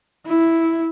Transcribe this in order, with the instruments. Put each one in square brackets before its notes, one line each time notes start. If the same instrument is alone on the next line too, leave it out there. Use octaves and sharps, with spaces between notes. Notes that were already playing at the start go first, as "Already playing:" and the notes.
[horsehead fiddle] E4